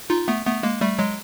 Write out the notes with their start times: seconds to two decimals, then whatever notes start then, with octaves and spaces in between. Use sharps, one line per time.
0.10 D#4 F4
0.28 A3 B3
0.45 A3 B3
0.63 G#3 A#3
0.81 G3 A3
0.99 F#3 G#3